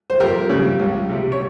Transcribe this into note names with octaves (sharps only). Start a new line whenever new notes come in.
C5
F2 G4 A#4
C#3 G3
C#2
C3 G3
C#5